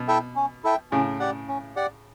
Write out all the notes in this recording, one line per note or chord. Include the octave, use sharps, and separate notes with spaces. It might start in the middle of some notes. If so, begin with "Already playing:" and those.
Already playing: B2
E4 A4 E5 G5
C#4
E4 A4 E5 G5
A2 C#3 C#4
G4 D5 F#5
C#4
G4 D5 F#5